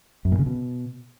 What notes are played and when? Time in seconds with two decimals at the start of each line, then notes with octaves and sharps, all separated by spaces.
0.25 F#2
0.32 A#2
0.39 C#3
0.46 B2